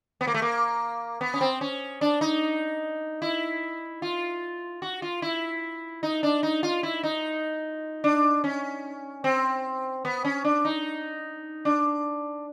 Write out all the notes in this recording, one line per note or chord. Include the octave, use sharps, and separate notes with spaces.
B3
A#3
A3
A#3
B3
C#4
C4
C#4
D4
D#4
E4
F4
F#4
F4
E4
D#4
D4
D#4
F4
E4
D#4
D4
C#4
C4
B3
C#4
D4
D#4
D4